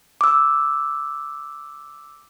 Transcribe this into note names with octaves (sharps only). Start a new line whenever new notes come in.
D6 E6